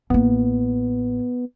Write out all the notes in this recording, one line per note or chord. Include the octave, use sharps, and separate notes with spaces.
A1 A#3 B3